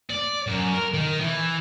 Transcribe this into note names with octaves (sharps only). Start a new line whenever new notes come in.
D5
F#2
A#4
D#3
E3